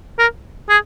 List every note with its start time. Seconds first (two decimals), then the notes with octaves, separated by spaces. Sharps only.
0.19 A#4
0.70 G#4